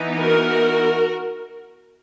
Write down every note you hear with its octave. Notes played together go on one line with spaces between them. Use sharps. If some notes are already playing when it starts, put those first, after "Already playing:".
Already playing: E3 B3 D#4
F#4 A#4